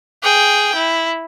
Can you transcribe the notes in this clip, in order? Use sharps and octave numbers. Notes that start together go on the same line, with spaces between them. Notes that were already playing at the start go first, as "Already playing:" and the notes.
G#4 G5
E4